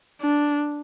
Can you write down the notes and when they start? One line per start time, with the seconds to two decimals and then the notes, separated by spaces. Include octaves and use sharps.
0.21 D4